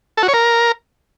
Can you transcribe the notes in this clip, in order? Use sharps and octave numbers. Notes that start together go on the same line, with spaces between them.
A4
F#4
C#5
A#4